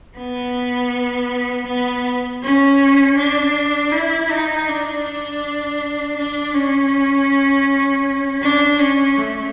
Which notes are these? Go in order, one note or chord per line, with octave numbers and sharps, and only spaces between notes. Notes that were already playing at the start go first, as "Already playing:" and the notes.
B3
B3
C#4
D4
E4
D#4
D4
D4
C#4
D4
C#4
A3